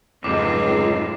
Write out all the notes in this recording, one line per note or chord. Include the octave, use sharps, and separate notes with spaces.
F1 C#2 G#2 F#3 C4 D#4 F4 D6